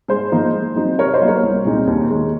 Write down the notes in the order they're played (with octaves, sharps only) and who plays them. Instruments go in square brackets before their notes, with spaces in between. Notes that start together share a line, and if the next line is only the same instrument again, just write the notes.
[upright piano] G#2 G#4 C5
F3 A#3 D#4
G#2
F#3 C4 D#4
C3 A#4 C#5
C5 D#5
F#3 A#3 D#4
A#4 C#5
C2
A#2 G#3 C4 D#4
D#2
D#3 G#3